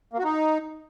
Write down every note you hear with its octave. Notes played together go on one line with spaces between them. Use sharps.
A#3
F#4
D#4